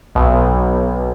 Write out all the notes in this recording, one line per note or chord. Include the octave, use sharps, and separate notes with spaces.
B1